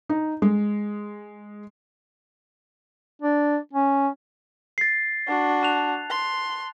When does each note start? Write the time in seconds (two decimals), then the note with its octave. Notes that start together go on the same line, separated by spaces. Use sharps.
0.09 D#4
0.42 G#3
3.22 D4
3.73 C#4
4.78 A6 C7
5.28 D4 F#4
5.63 A5 F#6 F7
6.10 C6